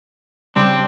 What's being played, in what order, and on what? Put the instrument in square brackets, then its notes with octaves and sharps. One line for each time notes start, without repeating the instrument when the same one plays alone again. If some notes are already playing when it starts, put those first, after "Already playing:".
[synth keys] C#3 G3 [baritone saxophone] C4 [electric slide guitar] D4